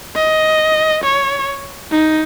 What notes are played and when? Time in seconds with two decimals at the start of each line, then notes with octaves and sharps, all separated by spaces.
0.16 D#5
1.04 C#5
1.91 D#4